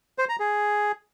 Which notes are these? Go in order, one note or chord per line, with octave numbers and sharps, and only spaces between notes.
C5
A#5
G#4